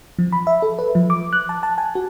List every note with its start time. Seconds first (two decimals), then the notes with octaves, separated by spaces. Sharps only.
0.19 F3
0.33 B5
0.47 E5
0.62 A4
0.79 B4
0.95 F3
1.10 D6
1.33 F#6
1.49 A5
1.63 A5
1.78 G#5
1.95 F#4